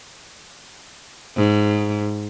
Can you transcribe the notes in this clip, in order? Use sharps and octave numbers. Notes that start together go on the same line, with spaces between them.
G#2